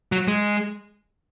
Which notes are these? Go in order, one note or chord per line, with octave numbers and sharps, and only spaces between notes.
F#3
G#3